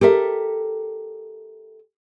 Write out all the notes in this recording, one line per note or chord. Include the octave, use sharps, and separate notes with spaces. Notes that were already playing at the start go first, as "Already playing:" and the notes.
G4 A4 A#4 E5